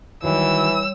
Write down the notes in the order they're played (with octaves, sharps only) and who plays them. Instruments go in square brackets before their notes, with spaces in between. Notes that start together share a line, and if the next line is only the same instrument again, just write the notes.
[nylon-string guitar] D#3 F#3 [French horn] E3 [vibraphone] G3 C#5 [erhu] E6